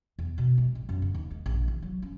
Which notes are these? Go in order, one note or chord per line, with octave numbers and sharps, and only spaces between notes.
E2
B2
G#3
A1
F#2
D3
D#2
G#3
A#1
E3
F#3
C#4